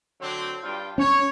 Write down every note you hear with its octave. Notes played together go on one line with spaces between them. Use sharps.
D3 F#3 C4
G2 F4 G5
C#4 C#5